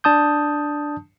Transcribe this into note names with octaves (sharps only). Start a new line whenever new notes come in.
D4 A5 D#6 G6